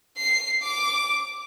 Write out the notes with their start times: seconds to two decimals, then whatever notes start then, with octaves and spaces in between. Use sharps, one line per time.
0.17 C7
0.62 D6